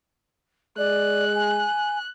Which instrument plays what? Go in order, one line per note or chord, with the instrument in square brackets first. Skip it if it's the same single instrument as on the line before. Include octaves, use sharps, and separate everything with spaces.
[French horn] G#3 [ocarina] D5 [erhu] F#6
[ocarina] G#5